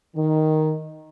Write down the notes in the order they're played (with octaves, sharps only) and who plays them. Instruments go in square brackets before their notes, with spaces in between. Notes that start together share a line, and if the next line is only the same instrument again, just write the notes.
[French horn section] D#3